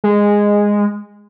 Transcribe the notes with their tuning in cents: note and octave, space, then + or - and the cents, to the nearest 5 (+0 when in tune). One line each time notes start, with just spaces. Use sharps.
G#3 -10